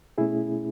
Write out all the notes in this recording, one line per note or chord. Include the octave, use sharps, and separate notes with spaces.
B2 A3 C#4 E4 G#4